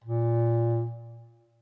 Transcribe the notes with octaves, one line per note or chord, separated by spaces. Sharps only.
A#2